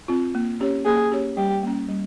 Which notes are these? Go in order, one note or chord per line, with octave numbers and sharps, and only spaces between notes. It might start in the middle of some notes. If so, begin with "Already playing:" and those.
C4 F4
A#3
C#4 G4 C#5
A#3 G#4
C#4 G4 C#5
G3 G4
A#3 C#4
G3